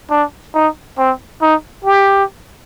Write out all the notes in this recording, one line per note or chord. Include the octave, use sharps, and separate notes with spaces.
D4
D#4
C4
D#4
G4